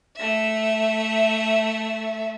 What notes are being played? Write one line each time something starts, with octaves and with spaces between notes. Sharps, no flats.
A3 E5